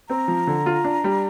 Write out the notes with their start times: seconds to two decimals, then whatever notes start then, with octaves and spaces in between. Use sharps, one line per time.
0.09 C4 A#5
0.28 F3
0.47 D3
0.66 F4
0.84 D4
1.04 G3